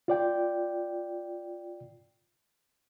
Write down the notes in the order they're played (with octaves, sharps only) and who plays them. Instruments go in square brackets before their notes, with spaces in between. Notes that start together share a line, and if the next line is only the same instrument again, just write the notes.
[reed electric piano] F4 D5 G5